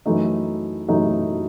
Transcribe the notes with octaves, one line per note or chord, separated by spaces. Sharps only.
F#2 E3 A3 D#4
F#2 E3 A3 D#4